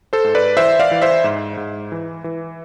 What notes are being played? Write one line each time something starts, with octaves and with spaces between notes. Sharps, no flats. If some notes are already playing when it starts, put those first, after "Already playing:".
A4 C5
G#2
B4 D5
E3 C5 E5
D5 F5
E3
C5 E5
G#2
G#2
E3
E3